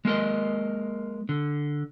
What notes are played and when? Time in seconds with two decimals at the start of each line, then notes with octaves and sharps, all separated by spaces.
0.05 G#3 A#3 A#4 D#5
1.29 D3